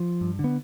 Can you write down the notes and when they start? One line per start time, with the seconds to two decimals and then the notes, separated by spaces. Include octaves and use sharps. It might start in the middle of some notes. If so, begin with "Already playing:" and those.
Already playing: F3
0.21 G2
0.39 D3
0.44 B3